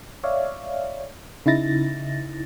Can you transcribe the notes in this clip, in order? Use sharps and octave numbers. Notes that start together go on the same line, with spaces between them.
C#5 D5 E5 F5
C#3 D#4 E4 A6 A#6